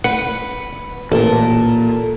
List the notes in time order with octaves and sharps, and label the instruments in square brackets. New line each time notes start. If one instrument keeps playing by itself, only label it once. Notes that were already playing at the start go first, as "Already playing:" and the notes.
[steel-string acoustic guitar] B4 [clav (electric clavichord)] F#5
[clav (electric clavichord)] A1 [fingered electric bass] A#2 [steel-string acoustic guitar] A4 A#4